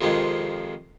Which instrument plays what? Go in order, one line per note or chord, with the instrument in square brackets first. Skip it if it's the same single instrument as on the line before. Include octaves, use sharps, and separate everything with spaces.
[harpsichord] F2 C3 D#3 F3 G#3